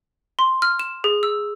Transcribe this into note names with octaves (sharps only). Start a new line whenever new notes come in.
C6
F6
E7
G#4
E6